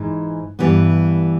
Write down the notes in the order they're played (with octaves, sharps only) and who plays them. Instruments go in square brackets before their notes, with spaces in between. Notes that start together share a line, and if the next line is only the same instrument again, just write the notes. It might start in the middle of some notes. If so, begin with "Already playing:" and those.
Already playing: [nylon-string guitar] G#2 E3 G#3
G2 E3 G3 B3